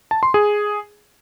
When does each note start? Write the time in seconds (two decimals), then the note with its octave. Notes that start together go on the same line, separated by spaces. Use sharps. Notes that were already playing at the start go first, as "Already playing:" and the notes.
0.11 A5
0.23 C6
0.34 G#4